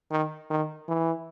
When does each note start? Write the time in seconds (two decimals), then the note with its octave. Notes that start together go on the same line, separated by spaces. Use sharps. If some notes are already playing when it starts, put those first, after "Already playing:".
0.11 D#3
0.50 D#3
0.89 E3